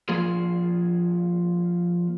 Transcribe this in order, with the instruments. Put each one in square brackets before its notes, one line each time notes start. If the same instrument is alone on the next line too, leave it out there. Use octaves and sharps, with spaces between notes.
[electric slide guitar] F3 A#3 F4 G#4